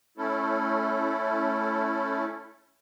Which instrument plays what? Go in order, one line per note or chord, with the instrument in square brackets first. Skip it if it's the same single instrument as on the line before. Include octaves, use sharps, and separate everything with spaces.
[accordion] A3 C#4 E4 A4